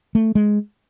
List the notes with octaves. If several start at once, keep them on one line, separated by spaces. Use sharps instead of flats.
A3
G#3